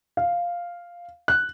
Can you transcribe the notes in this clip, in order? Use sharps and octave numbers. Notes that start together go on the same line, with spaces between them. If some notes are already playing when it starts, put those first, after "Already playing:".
F5
F#6